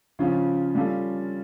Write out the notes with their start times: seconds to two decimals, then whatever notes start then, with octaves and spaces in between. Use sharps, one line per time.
0.19 C#3 F3 C#4 F4
0.75 G3 C#4 F4 A4